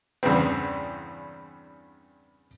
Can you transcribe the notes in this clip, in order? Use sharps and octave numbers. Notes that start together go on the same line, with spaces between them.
E2 G2 C#3 B3 C4